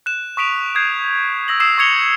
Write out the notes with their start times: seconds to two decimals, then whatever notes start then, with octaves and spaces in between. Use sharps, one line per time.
0.06 F#6 E7
0.37 C#6 D#6 B6 D7 E7 F7
0.75 D#6 G6 G#6 C7
1.48 E6 A#6 F#7
1.60 D#6 E6 C7 E7
1.78 C#6 D#6 G#6 C#7 F7 G7